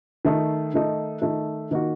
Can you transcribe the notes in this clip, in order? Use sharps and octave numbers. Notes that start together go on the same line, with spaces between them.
D#3 A3 D#4
D#3 A3 D#4
D#3 A3 D#4
D#3 A#3 D#4 F#4